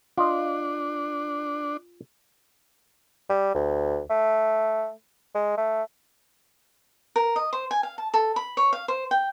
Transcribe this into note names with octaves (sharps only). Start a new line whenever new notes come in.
D4 F4 D#5
G3
D2
A3
G#3
A3
A#4
D#5
C5
G#5
F5
A5
A4
B5
C#5
F5
C5
G5